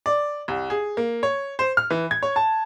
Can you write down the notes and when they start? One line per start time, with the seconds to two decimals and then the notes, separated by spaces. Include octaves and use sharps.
0.06 D5
0.48 C2
0.70 G#4
0.97 A#3
1.23 C#5
1.59 C5
1.77 F6
1.90 E3
2.11 G#6
2.23 C#5
2.36 A5